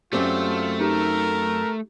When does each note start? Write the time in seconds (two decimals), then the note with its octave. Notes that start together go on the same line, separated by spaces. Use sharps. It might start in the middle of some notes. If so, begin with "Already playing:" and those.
0.13 F#2 A3 C4 F4 G4 D5
0.81 D#4 G4 A#4